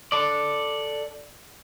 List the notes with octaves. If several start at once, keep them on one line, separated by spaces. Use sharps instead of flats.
A4 D5